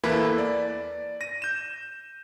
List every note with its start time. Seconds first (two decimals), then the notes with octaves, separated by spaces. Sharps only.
0.03 E2 A#3 E4 A4 B4 B5
0.38 D5
1.21 A#6 D#7
1.42 G6 E7